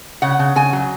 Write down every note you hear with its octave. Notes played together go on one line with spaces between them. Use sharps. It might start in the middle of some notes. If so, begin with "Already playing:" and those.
C#3 F#5
C#3
C#3 G#5
F#3